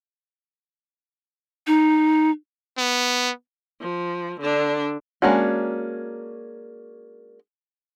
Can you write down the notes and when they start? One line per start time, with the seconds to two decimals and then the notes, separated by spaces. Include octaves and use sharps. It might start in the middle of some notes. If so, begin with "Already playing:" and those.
1.67 D#4
2.78 B3
3.81 F3
4.40 D3 D4
5.22 G#3 A#3 C#4 D4 F#4